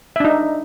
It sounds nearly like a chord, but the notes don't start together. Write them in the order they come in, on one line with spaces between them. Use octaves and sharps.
E5 D4 D#4